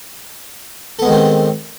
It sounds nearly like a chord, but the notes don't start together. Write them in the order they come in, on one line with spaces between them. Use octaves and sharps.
A4 B3 G#3 D#3 C4